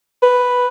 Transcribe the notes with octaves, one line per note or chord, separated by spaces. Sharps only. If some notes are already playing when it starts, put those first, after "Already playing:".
B4